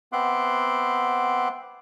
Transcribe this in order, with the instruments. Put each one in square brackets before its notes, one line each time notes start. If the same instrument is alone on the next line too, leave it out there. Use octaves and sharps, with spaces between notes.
[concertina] B3 C4 E5 F#5 C6 D6